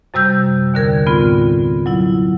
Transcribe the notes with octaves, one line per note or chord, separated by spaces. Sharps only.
F#2 C3 G3 E6 G6
D#2 D3 A#4 G#6
A2 B3 C4 F4
F#3 E4 F#5